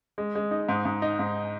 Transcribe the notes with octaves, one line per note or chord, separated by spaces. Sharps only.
G#3
G#3
D#4
G#2
G#2
D#4
G#2